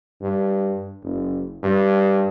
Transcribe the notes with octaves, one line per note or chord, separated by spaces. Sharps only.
G2
F#1
G2